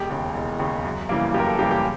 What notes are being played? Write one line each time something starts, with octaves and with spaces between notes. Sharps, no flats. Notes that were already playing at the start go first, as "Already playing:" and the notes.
Already playing: E1 G4
D#2 C#3
E1
D#2 C#3
F#2
C#3 E3 G3 A#3
F#2 G4
A#4
A4
C#3 E3 G3 A#3 G4
G4